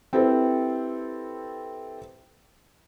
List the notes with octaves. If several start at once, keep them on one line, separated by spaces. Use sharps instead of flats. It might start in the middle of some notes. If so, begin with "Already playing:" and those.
C4 E4 G4 A4 B4 C5